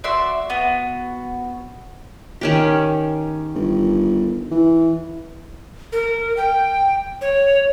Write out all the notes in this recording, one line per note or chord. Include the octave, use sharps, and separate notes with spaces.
F#4 D5 E5 C6
B3 F#4
D#3 C#4 G4
G1
E3
A#4
G5
C#5